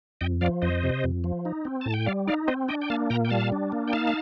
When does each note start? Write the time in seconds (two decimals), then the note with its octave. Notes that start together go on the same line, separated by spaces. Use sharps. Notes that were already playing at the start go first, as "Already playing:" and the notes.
0.21 F2 D#5 G5
0.41 F3 D5 F5
0.62 F2 C5 D#5
0.83 C3
1.04 F2
1.24 F3
1.45 D#4
1.65 C4
1.81 A2 A5
1.94 G5
2.06 G3 D5 F5
2.27 D#4 D5 F5
2.48 C4 C5 D#5
2.68 D4 D#5 G5
2.81 G5
2.90 A#3 F5 A5
3.10 A#2 G5 A#5
3.25 G5
3.30 G3 F5 A5
3.52 D4
3.72 A#3
3.88 G5
3.93 D#4 F5 A5